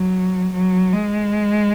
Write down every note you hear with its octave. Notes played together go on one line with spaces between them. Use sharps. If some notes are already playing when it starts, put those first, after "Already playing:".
Already playing: F#3
F#3
G#3